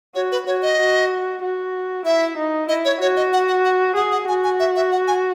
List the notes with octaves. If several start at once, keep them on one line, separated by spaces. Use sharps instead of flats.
F#4 C#5
B4
F#4 C#5
D#5
F#4
F#4
E4 E5
D#4
E4 D#5
C#5
F#4 C#5
D#5
F#5
F#5
F#5
G#4 F#5
F#5
F#4 G#5
G#5
E5
E5
F#5
G#5